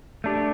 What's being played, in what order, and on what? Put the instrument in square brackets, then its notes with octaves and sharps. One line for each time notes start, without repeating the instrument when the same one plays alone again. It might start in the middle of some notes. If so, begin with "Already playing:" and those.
[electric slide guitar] A3 D4 G4